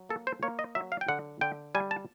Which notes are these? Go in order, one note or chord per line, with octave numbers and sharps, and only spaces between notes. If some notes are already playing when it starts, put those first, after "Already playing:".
Already playing: F#3
A#3 A4
C5
A#3 C#5
D#5
F#3 E5
F5
G5
D3 F#5
D3 G5
G3 G#5
A5